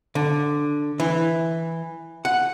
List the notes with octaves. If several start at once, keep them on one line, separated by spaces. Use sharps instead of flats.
D3
E3
F#5